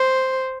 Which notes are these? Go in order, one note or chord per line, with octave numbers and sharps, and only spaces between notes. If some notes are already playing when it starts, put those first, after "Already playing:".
Already playing: C5